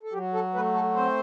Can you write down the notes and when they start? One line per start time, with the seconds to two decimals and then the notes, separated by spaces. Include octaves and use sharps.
0.03 A4
0.12 F#3 G4
0.34 A4
0.54 A3 B4
0.74 A4
0.95 C4 C5